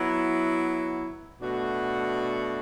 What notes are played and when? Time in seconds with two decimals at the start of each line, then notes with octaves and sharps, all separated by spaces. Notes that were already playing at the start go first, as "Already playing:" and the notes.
Already playing: F#3 B3 E4
1.41 B2 A3 D4 F#4